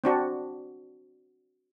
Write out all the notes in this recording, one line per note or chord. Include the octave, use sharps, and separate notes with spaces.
C4 D4 F#4